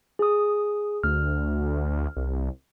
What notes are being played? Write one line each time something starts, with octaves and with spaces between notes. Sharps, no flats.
G#4 D#6
D2 F6
C2